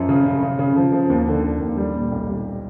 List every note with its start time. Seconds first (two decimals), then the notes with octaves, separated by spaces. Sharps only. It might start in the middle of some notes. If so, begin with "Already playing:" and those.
Already playing: F#2 F3
0.09 C#3
0.26 C#3
0.42 C#3
0.59 C#3
0.76 F3
0.93 F3
1.09 D#2
1.28 D3
1.43 D3
1.60 D#2
1.77 G3
1.95 A#2
2.12 B1
2.29 G3